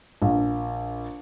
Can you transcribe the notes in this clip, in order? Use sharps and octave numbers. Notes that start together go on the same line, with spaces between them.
A#1